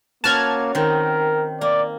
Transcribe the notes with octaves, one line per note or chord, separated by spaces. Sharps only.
A#3 C#4 F#4 B4 A5 F6 G#6
D#3 C4 A#4
A#3 D5